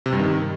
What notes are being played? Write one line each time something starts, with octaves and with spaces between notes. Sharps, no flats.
C3
G2
D#3